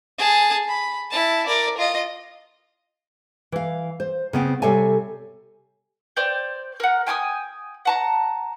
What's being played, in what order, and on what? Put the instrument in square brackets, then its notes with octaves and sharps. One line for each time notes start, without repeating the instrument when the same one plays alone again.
[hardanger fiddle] G#4 A5
B5
E4 A5
A#4 D5
F4 D#5
[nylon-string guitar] E3 F5
C5
C#3 B3 C4
C3 G3 A4 C#5 E5 G#5
[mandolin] C5 D5 G5
A#4 F#5
G5 G#5 D6 D#6
F#5 A5 A#5